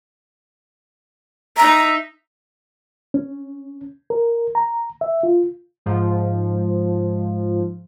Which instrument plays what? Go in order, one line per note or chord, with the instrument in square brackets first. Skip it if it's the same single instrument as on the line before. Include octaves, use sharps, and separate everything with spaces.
[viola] D#4 E5 [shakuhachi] A#5
[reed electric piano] C#4
A#4
A#5
E5
F4
[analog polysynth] G#2 F3